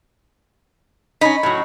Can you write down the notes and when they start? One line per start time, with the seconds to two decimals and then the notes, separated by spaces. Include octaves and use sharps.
1.21 C#4 D#4 B5
1.43 A2 F#3